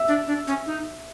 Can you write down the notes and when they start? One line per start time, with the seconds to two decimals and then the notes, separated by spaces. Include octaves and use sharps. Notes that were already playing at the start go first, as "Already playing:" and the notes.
Already playing: E5 E6
0.08 D4
0.27 D4
0.47 C#4
0.67 D#4